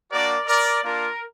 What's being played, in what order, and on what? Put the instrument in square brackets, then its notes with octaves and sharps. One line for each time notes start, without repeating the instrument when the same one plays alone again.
[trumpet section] A#3 D4 F#4 A#4 D5
A#4 D5
A#3 D4 F4 A#4